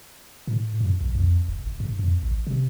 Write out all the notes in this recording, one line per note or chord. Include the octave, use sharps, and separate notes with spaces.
A2
F#2
B1
F2
F1
F#1
G2
F2
A1
C3